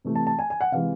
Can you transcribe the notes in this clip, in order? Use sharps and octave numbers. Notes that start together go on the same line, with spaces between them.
C3 E3 A3
A5
A5
G#5
G#5
F#5
C3 E3 G#3 F5